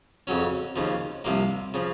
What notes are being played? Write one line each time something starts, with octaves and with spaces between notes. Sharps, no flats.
F2 C#3 F#3 C#4
D#2 C#3 F3
C2 C3 F3 A#3
C#3 F3